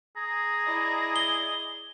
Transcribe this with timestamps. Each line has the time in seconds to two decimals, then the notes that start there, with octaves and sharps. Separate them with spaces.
0.17 G#4 A#5
0.67 E4 D5 D#5
1.16 G7